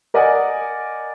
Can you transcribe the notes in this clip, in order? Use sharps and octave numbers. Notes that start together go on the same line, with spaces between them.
A#4 D5 D#5 F#5 G#5